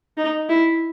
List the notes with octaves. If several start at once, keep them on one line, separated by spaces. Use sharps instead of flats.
D#4
E4